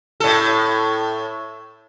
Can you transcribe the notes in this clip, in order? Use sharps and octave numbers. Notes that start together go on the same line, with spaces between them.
A2 A4